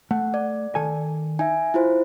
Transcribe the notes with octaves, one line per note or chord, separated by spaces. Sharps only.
A3 F#5
D5
D#3 A4 G#5
D#4 E5 G#5
E4 F4 C5